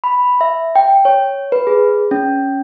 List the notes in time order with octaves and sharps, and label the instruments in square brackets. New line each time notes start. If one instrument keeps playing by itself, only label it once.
[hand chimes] B5
E5
G5
C#5
B4
G#4
C#4